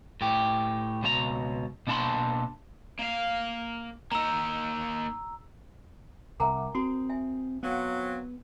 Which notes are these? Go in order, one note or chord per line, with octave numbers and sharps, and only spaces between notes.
A2 G4
C#2 B2 F#4 A#5
B2 A#3 D4 A5 B5 C6
A#3 F5
A#3 D#4 A#5 E6
C2 A#4 E5 F#5 G#5 A#5 D6
C4 F#4 D#6
E5 G#5
F#3 B3 C4 F5 F#5 F#6